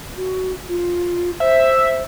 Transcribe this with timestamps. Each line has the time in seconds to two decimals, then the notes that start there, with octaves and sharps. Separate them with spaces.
0.17 F#4
0.69 F4
1.40 C5 E5